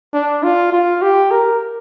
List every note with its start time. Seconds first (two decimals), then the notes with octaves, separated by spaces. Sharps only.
0.14 D4
0.43 F4
0.73 F4
1.02 G4
1.31 A#4